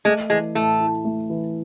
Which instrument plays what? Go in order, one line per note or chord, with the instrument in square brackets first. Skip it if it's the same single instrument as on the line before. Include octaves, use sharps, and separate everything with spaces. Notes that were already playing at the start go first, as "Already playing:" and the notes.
[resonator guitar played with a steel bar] G#3 [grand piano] A3
[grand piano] E3 [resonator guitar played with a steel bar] G#3
[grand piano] A2 [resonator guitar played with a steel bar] A3
[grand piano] E4
A3
E3